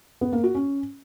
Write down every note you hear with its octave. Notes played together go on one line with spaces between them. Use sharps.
B3
A#3
F#4
C#4